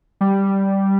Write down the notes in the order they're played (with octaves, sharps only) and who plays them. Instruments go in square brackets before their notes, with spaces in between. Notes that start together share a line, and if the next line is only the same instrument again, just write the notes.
[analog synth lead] G3